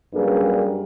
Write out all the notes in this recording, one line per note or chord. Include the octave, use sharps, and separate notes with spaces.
F#2 G3 A#3 D4 G#4 B4